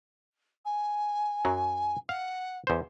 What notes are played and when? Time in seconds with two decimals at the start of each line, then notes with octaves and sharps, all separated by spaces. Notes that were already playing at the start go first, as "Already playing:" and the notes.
0.65 G#5
1.45 F#2 F#3
2.09 F5 F#5
2.67 E2 C5